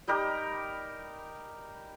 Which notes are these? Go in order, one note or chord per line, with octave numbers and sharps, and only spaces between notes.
G3 D#4 G4 A#4